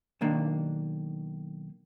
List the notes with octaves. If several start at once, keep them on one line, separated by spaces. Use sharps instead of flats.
B1 D#3 A#3 D4